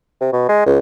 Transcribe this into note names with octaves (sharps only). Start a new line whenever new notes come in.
C3
B2
G#3
C#2